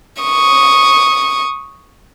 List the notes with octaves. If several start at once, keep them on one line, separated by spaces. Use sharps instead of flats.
C#6 D#6